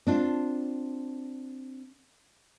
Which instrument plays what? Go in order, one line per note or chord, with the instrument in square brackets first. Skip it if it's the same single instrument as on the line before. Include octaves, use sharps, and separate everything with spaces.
[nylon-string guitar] C4 D4 F4